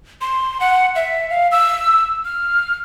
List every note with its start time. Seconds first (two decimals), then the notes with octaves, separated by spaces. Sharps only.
0.21 C6
0.60 F#5
0.96 E5
1.30 F5
1.52 E6
2.25 F6